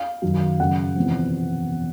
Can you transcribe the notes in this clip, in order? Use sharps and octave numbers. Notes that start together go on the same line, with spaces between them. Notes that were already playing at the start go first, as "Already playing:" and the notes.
Already playing: F5
F#2 D#3 F#3
F#2 C#3 F#3 F#5
E1 E2 C3 F3